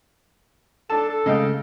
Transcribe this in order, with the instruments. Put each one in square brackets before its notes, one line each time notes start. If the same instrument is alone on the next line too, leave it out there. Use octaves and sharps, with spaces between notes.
[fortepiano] D4 A5 [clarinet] A4
[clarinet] A4
[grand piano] C#3 [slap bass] G#3 A3 C#4 [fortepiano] D#5 F5 G5